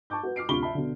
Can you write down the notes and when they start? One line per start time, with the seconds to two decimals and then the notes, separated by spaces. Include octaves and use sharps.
0.10 A5 C#6 D6 G6
0.23 F#4 B4
0.36 D6 F6 C7 D7
0.49 D2 C3 F4 B5 C#6 G7
0.63 E5 A5 B5
0.75 B2 D3